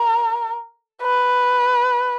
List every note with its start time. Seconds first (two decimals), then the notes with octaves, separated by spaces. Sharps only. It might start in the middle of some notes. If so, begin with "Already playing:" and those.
Already playing: A#4
1.03 B4